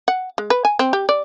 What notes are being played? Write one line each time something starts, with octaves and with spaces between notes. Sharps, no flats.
F#5
G#3
B4
G#5
C4
G4
D5